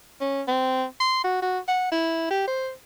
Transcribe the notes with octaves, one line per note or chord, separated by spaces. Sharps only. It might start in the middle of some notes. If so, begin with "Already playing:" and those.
C#4
C4
C6
F#4
F#4
F#5
E4
G4
C5